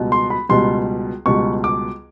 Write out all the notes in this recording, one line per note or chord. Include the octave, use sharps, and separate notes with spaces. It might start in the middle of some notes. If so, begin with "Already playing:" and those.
Already playing: C#2 B2 G3
C6
B5
C#2 B2 G3 C6
C#2 B2 G3 C#6
D6